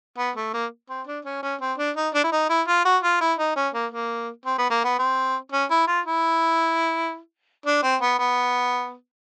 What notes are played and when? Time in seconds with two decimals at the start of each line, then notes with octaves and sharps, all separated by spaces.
0.18 B3
0.36 A3
0.54 A#3
0.89 C4
1.07 D4
1.25 C#4
1.43 C#4
1.60 C4
1.78 D4
1.96 D#4
2.14 D4
2.24 E4
2.32 D#4
2.49 E4
2.67 F4
2.85 F#4
3.03 F4
3.21 E4
3.38 D#4
3.56 C#4
3.74 A#3
3.92 A#3
4.45 C4
4.58 B3
4.70 A#3
4.84 B3
4.99 C4
5.52 C#4
5.70 E4
5.87 F4
6.06 E4
7.66 D4
7.83 C4
8.01 B3
8.19 B3